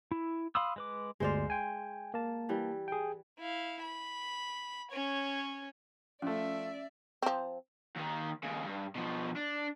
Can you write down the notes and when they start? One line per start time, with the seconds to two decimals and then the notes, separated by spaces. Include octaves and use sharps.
0.12 E4
0.55 F5 B5 C6 D#6 E6
0.76 G#3 B4 D6
1.20 G1 D2 G#3 C5 D5 F5
1.50 G5 G#5
2.14 A#3 A5
2.49 E3 G3
2.88 G#4 G5
3.40 E4 F5
3.82 B5
4.91 C#4 C#5
6.22 F3 A3 C#4 D5 E5
7.22 F3 C4
7.96 D#2 D#3
8.43 D#2 C#3
8.66 G2
8.95 B2 F3
9.36 D4